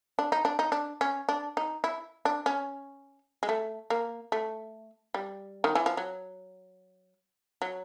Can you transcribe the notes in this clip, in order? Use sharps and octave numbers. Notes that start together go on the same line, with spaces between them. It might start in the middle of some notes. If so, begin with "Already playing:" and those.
D4
D#4
D4
D#4
D4
C#4
D4
D#4
E4
D4
C#4
G#3
A3
A#3
A3
G3
D#3
E3
F3
F#3
F#3